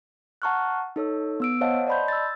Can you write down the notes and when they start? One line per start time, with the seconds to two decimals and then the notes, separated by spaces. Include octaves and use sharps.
0.42 F#5 A5 A#5 C#6 F6 F#6
0.96 D#4 A4 C#5 E6
1.40 B3 E6 D7
1.61 C5 C#5 D#5 F5 F#5 A5
1.87 D5 D#5 A5 B5 C6 G6
2.08 E6 A6